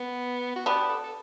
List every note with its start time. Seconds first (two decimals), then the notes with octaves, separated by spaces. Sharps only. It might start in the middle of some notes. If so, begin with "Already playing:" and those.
Already playing: B3
0.56 F#4
0.66 B3 D4 G4
0.81 G4
0.89 A4
1.04 A4